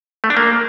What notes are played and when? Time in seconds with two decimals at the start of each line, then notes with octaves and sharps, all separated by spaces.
0.24 A3
0.30 D4
0.37 A#3